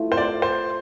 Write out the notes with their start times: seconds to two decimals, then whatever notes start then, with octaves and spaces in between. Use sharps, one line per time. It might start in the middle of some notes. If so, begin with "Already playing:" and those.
Already playing: F3 A3 E4 B4
0.12 C5
0.17 D5
0.42 C5